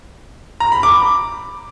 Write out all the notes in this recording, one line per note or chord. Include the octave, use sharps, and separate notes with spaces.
A#5
B5
D6